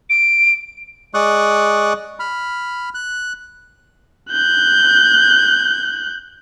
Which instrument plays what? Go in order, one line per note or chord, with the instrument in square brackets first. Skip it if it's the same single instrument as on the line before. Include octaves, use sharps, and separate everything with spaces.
[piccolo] D7
[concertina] G#3 D5 C#6 D#6 F#6
B5 F6
F#6
[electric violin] F#6 G6